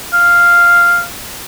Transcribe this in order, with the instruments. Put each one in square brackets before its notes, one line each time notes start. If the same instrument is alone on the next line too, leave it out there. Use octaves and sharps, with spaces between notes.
[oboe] F5